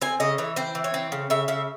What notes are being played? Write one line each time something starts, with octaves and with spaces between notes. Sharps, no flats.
C4 G#5
C#3 D#5
E3 C#5
C4 C5
E3
C#5
C4
C#3
C#3 E5
C#3 E5